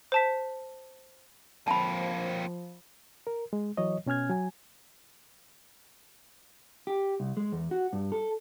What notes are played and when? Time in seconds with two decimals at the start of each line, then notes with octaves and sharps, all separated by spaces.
0.12 C5 A5 B6
1.68 F3 A#3 C4 A5 B5
3.27 A#4
3.53 G#3
3.77 E3 F#3 C#5 D#5
4.06 B2 C#4 G#5 F6 G#6
4.29 F#3 G#5
6.87 G4
7.20 C2
7.37 G#3
7.52 E2
7.71 F#4
7.93 G2
8.12 A4